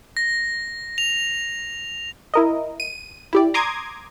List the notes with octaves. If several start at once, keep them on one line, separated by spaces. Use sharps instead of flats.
A#6
F7
E4 A#4 D#5
D#7
E4 G4 D5
A#5 C6 D6 D#6 G#6